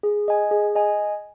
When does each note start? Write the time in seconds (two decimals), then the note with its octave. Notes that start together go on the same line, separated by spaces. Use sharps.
0.03 G#4
0.28 D#5 G#5
0.51 G#4
0.75 D#5 G#5